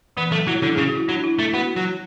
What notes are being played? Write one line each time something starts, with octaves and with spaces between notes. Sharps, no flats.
E3 B3
F#3 A3
F#3 E4
D3 E4
G#4
C#3
F#4
E4
F#3 D4
E4
A3 E4
B3 F#4
F#3